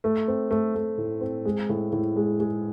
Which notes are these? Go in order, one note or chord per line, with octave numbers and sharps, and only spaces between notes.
A3
C4
A3
A3
A2
C4
G#3
A2
A2
G#3
G#3